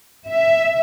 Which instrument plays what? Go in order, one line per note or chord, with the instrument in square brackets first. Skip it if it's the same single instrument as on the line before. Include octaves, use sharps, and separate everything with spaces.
[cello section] E5